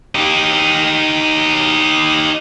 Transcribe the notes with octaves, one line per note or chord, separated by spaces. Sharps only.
D#4 G4